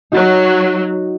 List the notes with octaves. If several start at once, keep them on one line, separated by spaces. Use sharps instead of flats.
F#3 D#4 F#4